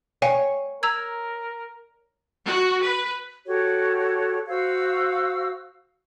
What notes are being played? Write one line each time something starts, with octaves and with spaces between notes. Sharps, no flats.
C#5 F5 G5 G#5
A#4 A#5 E6 G#6
F#4
B4
F#4 G4 A4 C#5
F#4 C5 F5 E6